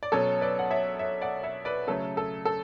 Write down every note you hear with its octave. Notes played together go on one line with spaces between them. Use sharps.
D5
B2 F#3 C#4 A4 C#5
B4 D5
F#5
C#5 E5
C#5 E5
D5 F#5
C#5 E5
B4 D5
C#3 F#3 A3 A4
A4
A4